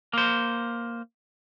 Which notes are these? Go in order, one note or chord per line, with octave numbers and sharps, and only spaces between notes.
A#3 C5